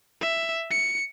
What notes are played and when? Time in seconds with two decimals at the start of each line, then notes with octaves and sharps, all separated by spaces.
0.21 E5
0.70 C#7